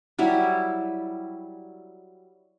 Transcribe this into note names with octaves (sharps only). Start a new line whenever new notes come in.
F#3 G3 E4